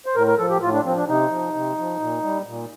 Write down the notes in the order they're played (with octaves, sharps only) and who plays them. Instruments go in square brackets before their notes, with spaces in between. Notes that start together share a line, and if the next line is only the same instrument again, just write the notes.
[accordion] C5
A2 A#4
A#4
F3 A4
G4
A2 F4
D4
F3 C4
D4
C3 D#4
F3
C3
F3
A#2
G3
A#2